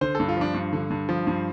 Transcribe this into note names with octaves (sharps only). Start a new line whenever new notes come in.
D3 C5
G2 A4
F4
F3 D4
G2
D3
G2
F3
G2